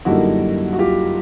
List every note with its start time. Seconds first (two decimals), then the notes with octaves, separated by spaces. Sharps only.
0.05 F#2 D3 G3 A#3 D#4 E4 F#4
0.73 F#4
0.79 F4 G4